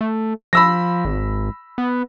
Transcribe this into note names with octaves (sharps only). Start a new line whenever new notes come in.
A3
F3 B5 E6 A#6
G#1
B3